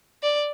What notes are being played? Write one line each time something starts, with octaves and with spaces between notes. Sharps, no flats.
D5